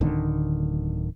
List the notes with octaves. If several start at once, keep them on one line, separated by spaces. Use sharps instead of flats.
D1 D3 D#3